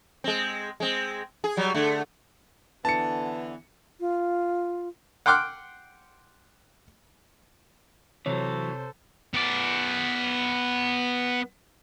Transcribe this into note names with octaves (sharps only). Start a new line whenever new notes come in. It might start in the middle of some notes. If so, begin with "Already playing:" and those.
G#3 C4
G#3 C4
G#4
F#3 G3
D3 A3
D3 E3 B3 A5 C#7
F4
F#5 G5 C6 D6 F6 F#6
C3 E3 F#3 A4 C5 C#5
B3 D5